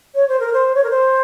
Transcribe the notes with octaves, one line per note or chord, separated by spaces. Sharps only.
C#5
C5
A#4
C5
C#5
A#4
C5